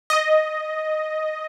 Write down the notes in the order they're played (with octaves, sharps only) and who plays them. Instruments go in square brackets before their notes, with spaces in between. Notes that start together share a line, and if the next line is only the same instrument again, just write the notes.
[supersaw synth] D#5